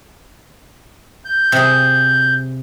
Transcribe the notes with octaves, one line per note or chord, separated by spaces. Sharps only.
G6
C3 G#4